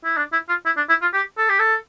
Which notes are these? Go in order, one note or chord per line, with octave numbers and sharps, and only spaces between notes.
E4
D4
E4
F4
E4
D4
E4
F4
G4
A4
G4
A4